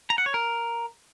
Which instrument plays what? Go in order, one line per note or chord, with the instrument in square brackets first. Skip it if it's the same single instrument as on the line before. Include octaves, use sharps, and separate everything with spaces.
[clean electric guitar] A#5
F#5
C#5
A#4